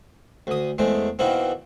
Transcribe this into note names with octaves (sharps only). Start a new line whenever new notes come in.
D2 D#6
E2 G#3 A3 C4
B2 D#3 E3 A#3 C4